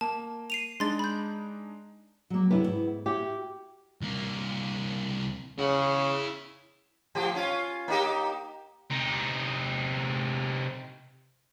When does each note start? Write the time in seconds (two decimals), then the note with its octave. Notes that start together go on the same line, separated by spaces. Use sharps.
0.01 A#3 A5
0.50 C7 D#7 F7
0.80 G#3 D4 D#4 C6 A6
0.99 B5 G6
2.30 F#3 G3 A#3
2.51 F#2 C3 B3 D4 E4
2.63 D#2 G#2
3.06 E4 F#4 G4 E5
4.01 C2 A#3
5.59 C#3 E4 F#5
7.15 A2 F3 G4
7.35 C#4 F4
7.88 A#3 D#4 G4
8.91 C3 D#4